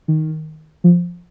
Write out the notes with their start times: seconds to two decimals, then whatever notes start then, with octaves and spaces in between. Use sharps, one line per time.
0.08 D#3
0.84 F3